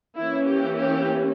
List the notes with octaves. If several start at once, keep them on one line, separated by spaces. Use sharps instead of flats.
E3 A#3 C#4 E4
G4
G4